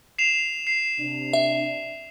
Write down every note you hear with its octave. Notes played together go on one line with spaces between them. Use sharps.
C7 E7 F7
C7
C3 D4
E5